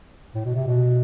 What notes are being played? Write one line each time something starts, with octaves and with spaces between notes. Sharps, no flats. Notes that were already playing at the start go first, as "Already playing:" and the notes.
A2
B2
C3
B2